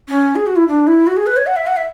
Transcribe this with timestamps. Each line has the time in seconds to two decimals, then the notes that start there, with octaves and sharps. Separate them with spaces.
0.08 C#4
0.36 G#4
0.47 F#4
0.56 E4
0.68 D4
0.87 E4
1.07 F#4
1.17 G#4
1.26 B4
1.37 C#5
1.47 F#5
1.56 E5
1.67 F#5
1.77 E5